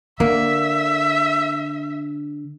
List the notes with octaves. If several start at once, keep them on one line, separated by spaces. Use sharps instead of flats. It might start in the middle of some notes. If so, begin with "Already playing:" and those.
D3 A#3 E5